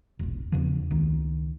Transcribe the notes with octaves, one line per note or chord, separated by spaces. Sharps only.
E1 A#1
E2 C#3 F3
C#2 D#3